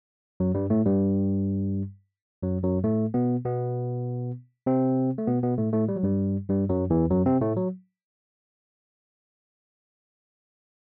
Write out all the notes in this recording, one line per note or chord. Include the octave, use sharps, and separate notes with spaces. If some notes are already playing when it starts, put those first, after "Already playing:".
F#2 F#3
G2 G3
A2 A3
G2 G3
F#2 F#3
F#2 F#3
A2 A3
B2 B3
B2 B3
C3 C4
A3
B2 B3
B2 B3
A2 A3
A2 A3
G3
F#3
G2 G3
G2 G3
F#2 F#3
E2 E3
F#2 F#3
C3 C4
A2 A3
F#3